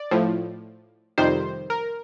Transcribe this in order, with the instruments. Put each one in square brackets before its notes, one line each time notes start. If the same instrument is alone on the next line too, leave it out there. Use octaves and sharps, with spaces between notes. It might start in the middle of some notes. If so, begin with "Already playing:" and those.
Already playing: [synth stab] D5
A2 F3
F2 C3 D#3 G3 C5
A#4